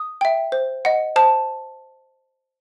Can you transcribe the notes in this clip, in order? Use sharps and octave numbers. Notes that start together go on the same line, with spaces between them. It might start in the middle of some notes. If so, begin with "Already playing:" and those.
Already playing: D#6
E5 G5
C5
D#5 F#5
C5 A5